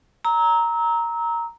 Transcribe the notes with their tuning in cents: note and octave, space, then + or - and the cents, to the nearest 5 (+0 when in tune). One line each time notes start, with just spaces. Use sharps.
A#5 +0 E6 -30